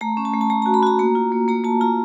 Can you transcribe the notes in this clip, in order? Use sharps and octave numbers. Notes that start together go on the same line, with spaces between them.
A3 A#5
C#4
A5
A3
A5
A3 A#5
A#5
F#4
B5
F#4 A#5
A#3 A#5
F4
A#3
A#3 A#5
A#3 A5
F4 A#5